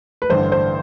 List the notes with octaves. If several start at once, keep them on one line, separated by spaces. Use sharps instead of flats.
B4
A1 G2 D3 C5
C5